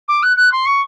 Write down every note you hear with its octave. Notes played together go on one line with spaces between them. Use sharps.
D6
F#6
F#6
C6
C#6